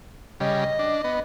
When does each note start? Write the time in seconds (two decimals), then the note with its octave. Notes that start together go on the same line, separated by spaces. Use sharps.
0.40 C#3 G3 D#5
0.79 D4
1.04 B3